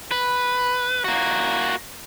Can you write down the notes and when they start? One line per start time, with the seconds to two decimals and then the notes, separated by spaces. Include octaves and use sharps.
0.11 B4
1.05 A#3 F#4